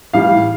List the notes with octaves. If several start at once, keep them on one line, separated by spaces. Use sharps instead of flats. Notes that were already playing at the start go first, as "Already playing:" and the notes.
A2 E3 G3 F5